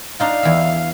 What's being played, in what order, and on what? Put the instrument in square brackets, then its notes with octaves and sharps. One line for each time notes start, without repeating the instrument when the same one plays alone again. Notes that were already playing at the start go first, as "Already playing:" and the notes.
[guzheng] D4 D#4 F4 [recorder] F5
[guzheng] E2 E5